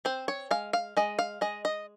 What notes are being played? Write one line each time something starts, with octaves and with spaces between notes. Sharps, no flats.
C4 C5
C#5
G#3 F5
F5
G#3 D#5
F5
G#3 D#5
D#5